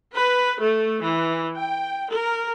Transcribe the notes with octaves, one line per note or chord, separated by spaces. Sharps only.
B4
A3
E3
G5
A#4